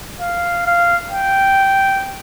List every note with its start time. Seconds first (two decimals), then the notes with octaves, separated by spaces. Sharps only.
0.20 F5
0.67 F5
1.11 G5